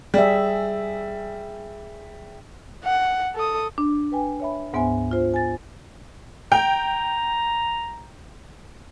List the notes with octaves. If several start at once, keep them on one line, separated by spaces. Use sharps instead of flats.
G3 G#4 E5
F#5
A4 D#6
D4
B4 G5 G#5
C#5 E5 B5
D2 G#2 B3 C5 E5 G#5
F4 C5
G#5 A6
G5 A#5